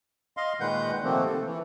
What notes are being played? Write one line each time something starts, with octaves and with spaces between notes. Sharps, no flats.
D#5 F5 C6
A#2 D#3 G#3 B4 F#5 G6
C3 D#3 F3 A3 A#3 C4
A4
E3